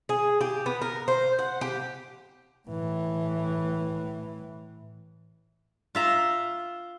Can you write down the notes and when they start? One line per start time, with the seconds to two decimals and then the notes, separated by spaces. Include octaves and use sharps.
0.09 G#4
0.41 G4
0.66 B3
0.82 A#4
1.08 C5
1.39 F#5
1.61 G4
2.68 A2 E3
5.95 F4 E5 A#5